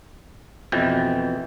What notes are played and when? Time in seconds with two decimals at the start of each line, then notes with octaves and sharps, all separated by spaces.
0.72 F2 B2 E3 G5